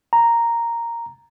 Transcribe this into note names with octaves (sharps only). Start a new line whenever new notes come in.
A#5